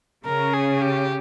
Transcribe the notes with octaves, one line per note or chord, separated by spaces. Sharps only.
C#3 A#4
G#4
G4